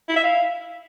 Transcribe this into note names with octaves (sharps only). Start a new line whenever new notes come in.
E4
E5
F5